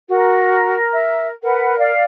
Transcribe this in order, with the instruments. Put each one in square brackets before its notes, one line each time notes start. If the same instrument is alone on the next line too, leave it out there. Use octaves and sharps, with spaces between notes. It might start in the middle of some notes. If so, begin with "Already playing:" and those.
[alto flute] F#4 [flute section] A#4
[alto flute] E5
[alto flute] A#4 [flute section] B4 F#5
[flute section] D5 F5